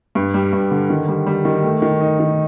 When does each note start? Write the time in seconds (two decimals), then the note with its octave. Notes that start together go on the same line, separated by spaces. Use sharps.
0.15 G2
0.34 G3
0.53 G2
0.71 D3
0.90 D#3
1.08 G3
1.26 G3
1.45 D#3
1.63 A3
1.82 D#3
2.01 D#4
2.19 D#3